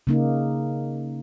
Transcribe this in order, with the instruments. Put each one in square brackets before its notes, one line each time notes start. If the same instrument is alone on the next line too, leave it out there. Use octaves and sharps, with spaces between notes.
[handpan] C#3 A#3 D#4